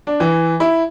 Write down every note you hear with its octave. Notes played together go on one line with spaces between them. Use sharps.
D4
E3
E4